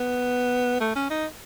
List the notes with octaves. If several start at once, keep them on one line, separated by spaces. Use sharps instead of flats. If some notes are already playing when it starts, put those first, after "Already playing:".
Already playing: B3
A3
C#4
D#4